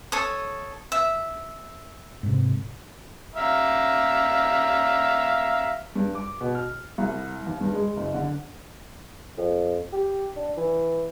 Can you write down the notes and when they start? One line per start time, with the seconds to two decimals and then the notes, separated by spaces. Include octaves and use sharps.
0.12 A4 C#5 D#6
0.92 E5
2.23 G#2 C3
3.36 E5 F5 A#5
5.95 G2
6.15 D6
6.41 B2
6.55 F6
6.98 C2
7.47 D#2
7.61 G2
7.73 G#3
7.97 F#1
8.14 D3
9.38 F2
9.93 G4
10.36 D4
10.57 E3